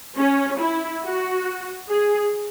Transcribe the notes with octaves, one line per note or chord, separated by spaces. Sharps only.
C#4
E4
F#4
G#4